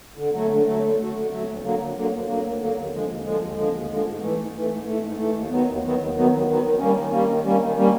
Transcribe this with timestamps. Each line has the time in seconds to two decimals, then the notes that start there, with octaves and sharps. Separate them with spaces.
0.17 D3
0.33 F#3 A3
0.49 D3
0.66 F#3 A3
0.81 D3
0.98 F#3 A3
1.14 D3
1.30 F#3 A3
1.46 D2
1.62 D3 F#3 A#3
1.78 D2
1.94 D3 F#3 A#3
2.11 D2
2.27 D3 F#3 A#3
2.43 D2
2.59 D3 F#3 A#3
2.75 D#2
2.91 D3 F3 G#3
3.08 D#2
3.24 D3 F3 G#3
3.40 D#2
3.56 D3 F3 G#3
3.72 D#2
3.89 D3 F3 G#3
4.05 G#2
4.21 E3 A3
4.37 G#2
4.53 E3 A3
4.69 G#2
4.85 E3 A3
5.02 G#2
5.18 E3 A3
5.34 D#2
5.49 D#3 F#3 B3
5.65 D#2
5.82 D#3 F#3 B3
5.98 D#2
6.15 D#3 F#3 B3
6.30 D#2
6.46 D#3 F#3 B3
6.63 D#3
6.79 G3 A#3 C#4
6.95 D#3
7.11 G3 A#3 C#4
7.27 D#3
7.43 G3 A#3 C#4
7.60 D#3
7.75 G3 A#3 C#4